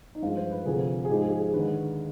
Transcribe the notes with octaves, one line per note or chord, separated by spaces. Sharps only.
D#4
G2 F3 G#3 F4
C5
B4
D2 C3 F3 G#4
G#4
G#2 F3 G#3 G4
G#4
G#4
G#4
D#2 D3 G#3 B4